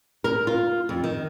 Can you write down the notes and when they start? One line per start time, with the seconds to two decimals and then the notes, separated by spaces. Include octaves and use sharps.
0.24 A#4
0.47 F4
0.89 F2
1.04 D#3